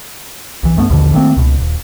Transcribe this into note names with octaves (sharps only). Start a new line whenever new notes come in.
B1 E3
G2 A3 B3
A#1 D#2 B2 D3
D#3 A3 A#3 C4
C#2 B2
D#1